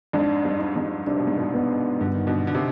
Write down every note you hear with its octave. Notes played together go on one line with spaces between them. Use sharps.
F2 G#2 D4
G2
D4
F2 G#2
C3 D4
B2
G#2
G2 B2
B3
G2 D3
D#3
B2 D3
D3
C3